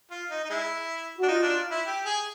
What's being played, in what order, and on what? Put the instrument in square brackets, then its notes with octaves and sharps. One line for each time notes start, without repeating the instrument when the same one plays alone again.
[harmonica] F4
D#4
D#4
G#3 E4
[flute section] F#4
[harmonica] D4
[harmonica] D#4 [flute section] F4
[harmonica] D4
E4
G4
G#4